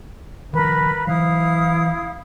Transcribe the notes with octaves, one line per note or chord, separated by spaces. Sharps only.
D#3 F3 G3 A#4 B4 B5
E3 F#3 E4 F5 D#6